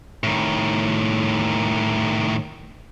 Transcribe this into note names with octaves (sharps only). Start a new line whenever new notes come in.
A2 D#3